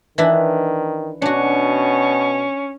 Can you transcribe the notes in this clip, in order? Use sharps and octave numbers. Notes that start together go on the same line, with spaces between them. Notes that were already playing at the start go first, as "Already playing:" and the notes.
D#3 E3 D4 E4
B2 C#4 D4 F#4